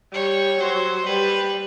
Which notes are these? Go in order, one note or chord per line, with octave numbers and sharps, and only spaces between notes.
G3 C#5
F#3 C5
G3 B4